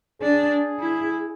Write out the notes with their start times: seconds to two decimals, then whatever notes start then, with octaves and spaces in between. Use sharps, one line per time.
0.21 D4 G#4
0.80 E4